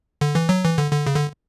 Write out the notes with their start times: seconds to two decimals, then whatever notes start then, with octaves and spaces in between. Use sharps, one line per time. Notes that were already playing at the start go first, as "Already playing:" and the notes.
0.21 D3
0.35 E3
0.49 F#3
0.64 E3
0.78 D3
0.92 D3
1.07 C#3
1.16 D3